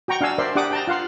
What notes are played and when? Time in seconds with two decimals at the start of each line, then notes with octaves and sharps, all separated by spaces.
0.08 F#4 G5 A#5 C#6
0.21 D4 F5 F#5 G#5 E6
0.38 A#4 C5 D5 E5 C6
0.56 D4 G4 F#5 D6 D#6
0.71 G5 A5 A#5
0.88 F4 F5 F#5 C6